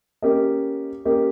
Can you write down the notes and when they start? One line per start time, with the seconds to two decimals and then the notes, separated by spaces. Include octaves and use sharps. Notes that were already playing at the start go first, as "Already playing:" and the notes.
0.22 A#3 C#4 G4 A#4 D#5
1.05 A#3 C#4 G4 A#4 D#5